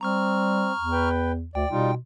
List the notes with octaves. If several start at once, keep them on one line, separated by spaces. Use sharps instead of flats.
G3 C4 A#5 C#6 F6
E2
B4 G5
D2 D5 G5
B2 G3 D#4 F4